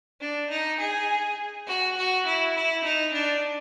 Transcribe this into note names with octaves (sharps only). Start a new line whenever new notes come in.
D4
D#4
G#4
F#4
F#4
E4
E4
D#4
D4